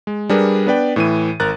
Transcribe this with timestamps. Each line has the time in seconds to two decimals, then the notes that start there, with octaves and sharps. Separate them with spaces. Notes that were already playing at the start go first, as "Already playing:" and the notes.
0.07 G#3
0.29 G3 D4 G#4 A#4 B4
0.66 B3 D4 B4 D5 G5
0.96 A2 E3 D#7
1.40 G#1 A#4 A#5 F#6 A6